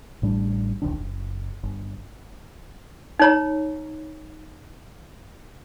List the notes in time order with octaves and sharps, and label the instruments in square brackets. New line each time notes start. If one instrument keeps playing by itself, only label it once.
[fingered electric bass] A1 A2 G3 D4
E1 C2 D#3 D4
F#1
G1
[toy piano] D#4 C#5 A#5